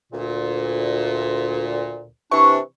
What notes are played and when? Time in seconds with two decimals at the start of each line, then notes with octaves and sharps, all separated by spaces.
0.12 D2 A#2
2.31 C3 E3 D4 C#6